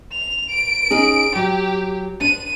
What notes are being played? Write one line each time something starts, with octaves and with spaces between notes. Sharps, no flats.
F7
D7
C#4 D#4 G#4
F#3 G4
D4 D#7